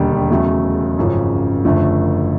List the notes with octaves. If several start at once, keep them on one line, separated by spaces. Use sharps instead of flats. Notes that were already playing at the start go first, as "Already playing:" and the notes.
Already playing: E1 D#2 D3 G3
E2 C#3 F#3 A3
G#1 F#2 C#3 F3
F#1 F#2 D3 F3 A3